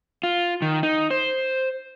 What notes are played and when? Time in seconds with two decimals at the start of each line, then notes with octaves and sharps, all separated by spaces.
0.23 F4
0.62 D#3
0.83 D#4
1.11 C5